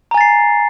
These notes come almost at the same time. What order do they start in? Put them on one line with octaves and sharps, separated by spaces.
A#5 G#5 A6 C7